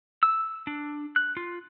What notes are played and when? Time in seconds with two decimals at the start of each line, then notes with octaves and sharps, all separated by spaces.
0.23 E6
0.67 D4
1.16 F#6
1.37 F4